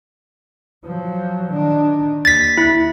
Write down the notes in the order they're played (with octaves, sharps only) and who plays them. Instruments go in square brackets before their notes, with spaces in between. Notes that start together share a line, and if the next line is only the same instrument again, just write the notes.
[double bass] F3 F#3
D#3 D4
[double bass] D#2 [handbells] A6 B6
[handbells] E4